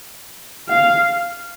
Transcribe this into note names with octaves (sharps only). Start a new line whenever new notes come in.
F5